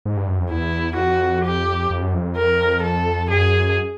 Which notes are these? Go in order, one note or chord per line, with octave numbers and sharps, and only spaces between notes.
G#2
G2
F#2
F2
E2 E4
F2 F#4
G4
F2
F#2
F2
A#4
A4
F#2 G#4